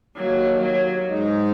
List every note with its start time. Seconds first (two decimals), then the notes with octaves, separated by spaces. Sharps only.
0.16 D#2 D#3 F#3 A#3
0.62 F#3
1.08 G#2 G#3 D#4